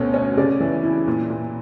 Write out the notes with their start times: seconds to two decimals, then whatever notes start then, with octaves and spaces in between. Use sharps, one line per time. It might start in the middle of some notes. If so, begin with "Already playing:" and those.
Already playing: D2 B2 C#4
0.14 C#4
0.37 C#3 D5
0.60 E3
0.84 E4
1.07 A#2
1.30 A#2